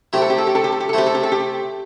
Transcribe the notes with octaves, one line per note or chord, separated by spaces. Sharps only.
C3 A3 E4 G4
A4
G4
A4
G4
A4
G4
A4
G4
A4
C3 A3 E4 G4
A4
G4
A4
G4